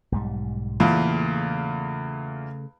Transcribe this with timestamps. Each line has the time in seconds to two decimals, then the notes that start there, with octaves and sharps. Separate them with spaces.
0.12 B1 G#2 G3
0.80 E2 A#2 C#3 A3